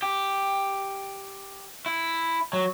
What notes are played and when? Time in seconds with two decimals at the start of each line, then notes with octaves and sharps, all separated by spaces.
0.02 G4
1.86 E4
2.53 F#3